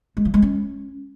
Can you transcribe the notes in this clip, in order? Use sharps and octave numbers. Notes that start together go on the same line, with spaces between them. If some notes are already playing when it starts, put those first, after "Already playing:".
G#3
F3
G#3
C#4